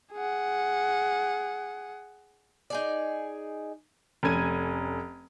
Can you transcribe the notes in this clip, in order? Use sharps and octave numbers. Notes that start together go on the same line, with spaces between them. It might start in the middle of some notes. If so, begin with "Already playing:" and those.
G#4 F#5
D#4 G#4 D5
F1 C#4 A4 G#6 D#7